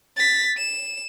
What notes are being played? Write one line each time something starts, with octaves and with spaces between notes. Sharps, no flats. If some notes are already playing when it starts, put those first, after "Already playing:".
A6 B6
E7